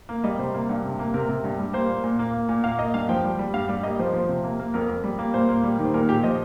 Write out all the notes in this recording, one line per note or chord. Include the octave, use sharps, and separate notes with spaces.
A#3
G3 D#5
C3 C5
A#3
G2
C3
A#3
C3 A#4
C3
G2
G3
A#3 C5
A#2
A#2
A#3
A#3
A#2
A#3 F5
A#3 D#5
G2 F5
F3 G5
G3
G3
G2 F5
G3
A#3 D#5
F3 C5
F3
C3
A#3
A#3
F2 A#4
F2
G3
A#3
A#2 C5
A#3
G3
D#3
C5
A#2 A#4
A#2 G4
F3 D#5